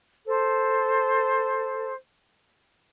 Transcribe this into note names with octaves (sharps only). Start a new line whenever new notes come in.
A4 C5